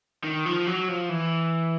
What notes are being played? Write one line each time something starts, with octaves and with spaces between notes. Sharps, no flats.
D#3
F3
F#3
F3
E3